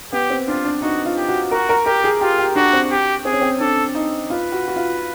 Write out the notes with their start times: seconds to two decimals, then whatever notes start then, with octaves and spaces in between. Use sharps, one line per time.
0.12 B3 G4
0.30 C4
0.48 D4 F4
0.65 D4
0.82 D#4 F#4
1.05 F4
1.16 G4
1.29 F#4
1.51 F#4 A#4
1.69 A#4
1.86 G4 A#4
2.04 G#4
2.21 F4 G4
2.38 G4
2.56 D4 F#4
2.73 C4
2.91 G4
3.25 C4 G#4
3.33 C#4
3.41 C4
3.60 D4 A4
3.95 D#4
4.29 F4 B4
4.52 F#4
4.68 F#4
4.76 F4